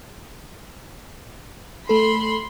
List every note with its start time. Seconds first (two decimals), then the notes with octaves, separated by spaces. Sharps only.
1.89 A3 A4 B5 C6